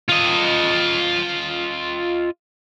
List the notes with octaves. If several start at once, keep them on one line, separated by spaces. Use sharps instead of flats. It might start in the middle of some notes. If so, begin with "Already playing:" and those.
F4 D#5